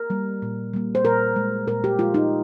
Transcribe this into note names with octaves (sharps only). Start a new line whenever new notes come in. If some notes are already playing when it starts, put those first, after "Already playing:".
Already playing: A#4
G3 A#3
A#2
G3 A#3
C5
A#2 A#4
G#3
A#2 A#4
G4
G#3 F4
D#4